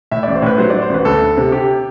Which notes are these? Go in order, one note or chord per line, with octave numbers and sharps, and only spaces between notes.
A2 E5
A1 D5
C5
A2 B4
F#3 C5
F#3 D5
C5
A1 B4
D2 A4
D2
C3
C3 G4